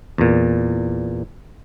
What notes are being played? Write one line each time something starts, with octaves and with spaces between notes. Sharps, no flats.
E2 A#2